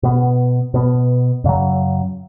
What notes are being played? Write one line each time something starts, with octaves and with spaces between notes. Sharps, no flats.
B2 B3
B2 B3
F#2 C#3 F#3